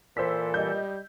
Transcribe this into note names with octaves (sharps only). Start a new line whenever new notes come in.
A#2 E3 A4 C5 E6 B6
G3 D#5 G6